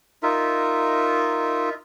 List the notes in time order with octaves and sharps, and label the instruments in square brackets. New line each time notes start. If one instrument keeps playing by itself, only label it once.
[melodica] D#4 F4 A#4 E5